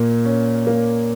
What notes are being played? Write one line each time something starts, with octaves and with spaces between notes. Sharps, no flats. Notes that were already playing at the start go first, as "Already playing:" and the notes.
Already playing: A#2 A#3
C#4
A#3